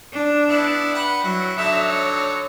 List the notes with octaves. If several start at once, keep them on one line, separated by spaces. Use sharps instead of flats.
D4
B3 E4 D5
B4 F#5 G5
F#3 E4 F#4
D3 F#3 D#4 E5
C#5